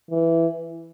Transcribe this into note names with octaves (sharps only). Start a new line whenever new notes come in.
E3